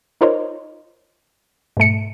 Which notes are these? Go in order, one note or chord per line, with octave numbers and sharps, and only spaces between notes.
D#4 F4 A#4 C5 C#5 D#5
G#2 B2 A3 C#7